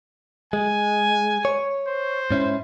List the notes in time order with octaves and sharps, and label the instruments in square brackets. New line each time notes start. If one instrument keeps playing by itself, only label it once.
[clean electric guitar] G#3 [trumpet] G#5
[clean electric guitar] C#5
[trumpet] C5
[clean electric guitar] G#2 C#4 E4